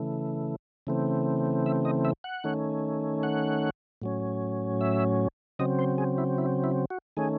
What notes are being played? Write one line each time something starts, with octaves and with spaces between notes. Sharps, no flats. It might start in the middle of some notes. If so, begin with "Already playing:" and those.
Already playing: C#3 E3 A3
C#3 E3 A3 C4
E5
D#5
E5
F#5
D#3 A3 C#4
F#5
A2 F#3 C#4
E5
C#3 F#3 C4 D#5
C5
G#4
E4
E4
E4
F#4
D#3 A3 C#4 G#4